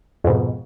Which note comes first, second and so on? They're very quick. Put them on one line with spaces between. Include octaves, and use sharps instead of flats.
F2 G#2 B2